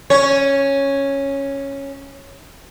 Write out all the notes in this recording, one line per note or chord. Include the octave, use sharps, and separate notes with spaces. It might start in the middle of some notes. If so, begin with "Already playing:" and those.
C#4 C#5